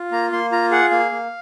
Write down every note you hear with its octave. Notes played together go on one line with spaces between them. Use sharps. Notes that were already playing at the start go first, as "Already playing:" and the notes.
Already playing: F4
A#3 A#5
A#3 C6
F4 A#5
G#4 F#5
A#3 F5
A#3